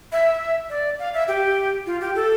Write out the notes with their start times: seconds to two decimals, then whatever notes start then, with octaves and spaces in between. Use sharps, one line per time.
0.12 E5
0.70 D5
0.99 F5
1.14 E5
1.28 G4
1.87 F4
2.01 G4
2.15 A4